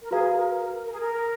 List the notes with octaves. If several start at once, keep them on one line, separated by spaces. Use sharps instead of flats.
A#4
F#4 G#4 B4 F5 A#5
A#4
A#4
A#4
G#4
A#4